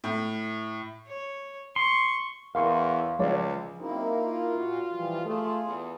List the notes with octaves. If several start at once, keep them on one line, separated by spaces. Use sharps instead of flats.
A2
C#5
C6 C#6
E2 A#4 F5 C6 C#6
C#2 F3 G#4 D5
F#2 A#3 C4 D#4 E4
F4
A#2 F#4
E3 F3 G3
A3 F4 G#4
E2